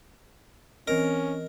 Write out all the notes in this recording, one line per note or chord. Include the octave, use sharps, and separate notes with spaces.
E3 C4 C#4 A#4 D#5